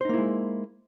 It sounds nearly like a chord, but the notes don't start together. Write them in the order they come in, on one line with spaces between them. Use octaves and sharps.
C5 D#4 A#3 E4 G#3